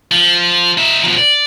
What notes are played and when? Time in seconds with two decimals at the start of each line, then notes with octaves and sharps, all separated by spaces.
0.11 F3
0.78 D#4 E5
1.04 B2 F3
1.18 D5